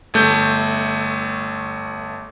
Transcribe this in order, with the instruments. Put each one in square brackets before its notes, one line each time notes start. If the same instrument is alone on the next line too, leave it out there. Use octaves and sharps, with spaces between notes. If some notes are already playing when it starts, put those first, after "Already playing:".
[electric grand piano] G1 A3 G6